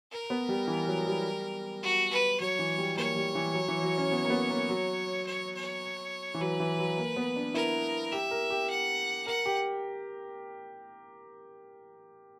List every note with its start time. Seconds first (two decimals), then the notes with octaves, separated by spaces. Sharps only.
0.11 A#4
0.30 B3
0.49 G3
0.68 E3
0.88 F#3
1.07 G3
1.83 F#4
2.11 B4
2.40 F#3 C#5
2.59 E3
2.78 G3
2.97 A#3 C#5
3.16 G3
3.35 E3
3.54 F#3
3.68 E3
3.83 F#3
3.98 C#4
4.12 B3
4.25 A#3
4.30 B3
4.50 A#3
4.69 F#3
5.26 C#5
5.55 C#5
6.34 E3
6.40 F#3 B4
6.60 E3
6.79 F#3
6.98 A#3
7.16 B3
7.36 D4
7.54 E4 A#4
8.12 G4 E5
8.31 A#4
8.50 G4
8.70 F#5
9.27 A#4 F#5
9.46 G4